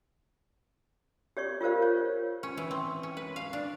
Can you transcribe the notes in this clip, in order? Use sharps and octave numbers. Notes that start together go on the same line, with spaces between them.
G4 C#5 D5 C#6
F4 G4 A#4 C5 F5
C#5
C#4
E3
C4
C#4
B4
F5
D4